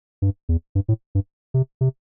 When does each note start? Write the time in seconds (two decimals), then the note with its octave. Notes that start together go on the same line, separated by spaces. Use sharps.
0.22 G2
0.49 E2
0.75 G2
0.88 A2
1.15 G2
1.54 C3
1.81 C3